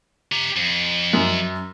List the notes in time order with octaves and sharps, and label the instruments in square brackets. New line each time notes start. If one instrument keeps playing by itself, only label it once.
[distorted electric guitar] G4 A#5
F2
[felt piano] F#2